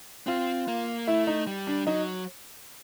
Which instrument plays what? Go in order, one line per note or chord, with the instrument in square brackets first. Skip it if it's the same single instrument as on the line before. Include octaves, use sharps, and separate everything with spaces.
[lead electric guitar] C4 [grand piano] F4
[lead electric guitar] A#3
[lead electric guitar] A3 [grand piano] E4
[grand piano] D#4
[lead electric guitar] G3
[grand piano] D4
[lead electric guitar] F#3 [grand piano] D#4